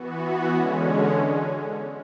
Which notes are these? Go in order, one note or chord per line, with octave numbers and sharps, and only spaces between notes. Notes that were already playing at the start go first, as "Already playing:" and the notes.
Already playing: E3 B3 F#4
D3 G#3 C#4